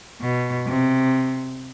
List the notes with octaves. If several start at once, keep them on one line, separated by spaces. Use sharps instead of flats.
B2
C3